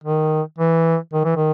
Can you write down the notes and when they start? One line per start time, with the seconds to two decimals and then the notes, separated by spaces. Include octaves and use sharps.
0.03 D#3
0.58 E3
1.13 D#3
1.25 E3
1.36 D#3